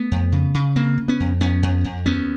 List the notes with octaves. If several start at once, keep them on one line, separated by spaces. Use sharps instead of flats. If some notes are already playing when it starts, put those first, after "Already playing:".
Already playing: A3 B3
F2
C#3
C#3
C#3 A#3 C4
C#3
B3 C#4
F2
F2 B3 C#4
F2
F2
D#2 B3 C#4